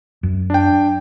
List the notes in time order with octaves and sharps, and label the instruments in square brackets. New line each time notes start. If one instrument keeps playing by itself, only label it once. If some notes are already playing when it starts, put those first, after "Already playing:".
[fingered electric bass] F#2
[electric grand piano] D4 G5